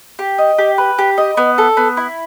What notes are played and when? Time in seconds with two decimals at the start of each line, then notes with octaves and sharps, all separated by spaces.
0.19 G4
0.38 D#5
0.58 G4
0.78 B4
0.98 G4
1.18 D#5
1.37 B3
1.58 A4
1.77 B3
1.97 E4